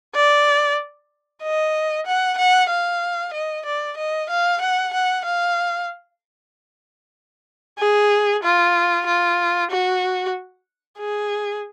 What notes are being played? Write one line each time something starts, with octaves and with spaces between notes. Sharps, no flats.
D5
D#5
F#5
F#5
F5
D#5
D5
D#5
F5
F#5
F#5
F5
G#4
F4
F4
F#4
G#4